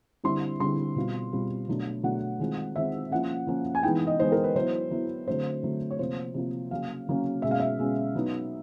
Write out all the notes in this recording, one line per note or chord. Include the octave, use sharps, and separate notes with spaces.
D3 G3 C4 E4 C6
D3 G3 C4 E4 C6
B2 G3 C4 F4
B2 G3 C4 F4
B2 F#3 A3 D4
B2 F#3 A3 D4 F#5
D#3 G#3 C4 F4
D#3 G#3 C4 F4 E5
F3 A#3 C#4 F#5
F3 A#3 C#4
G#5
E3 G#3 B3 D#4 G5
D#5
E3 G#3 B3 D#4 C5
A#4
B4
F#3 B3 E4 C5
F#3 B3 E4
D3 F#3 A3 C4 C5
D3 F#3 A3 C4
C#5
C3 F3 A#3 C5
C3 F3 A#3
C#3 F#3 A#3 C#4 F5
C#3 F#3 A#3 C#4
B2 G#3 C#4 E5
F5
E5
B2 G#3 C#4
F#3 B3 D#4